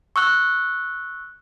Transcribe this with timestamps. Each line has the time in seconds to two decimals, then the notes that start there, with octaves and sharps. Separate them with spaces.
0.16 C#6 E6 F#6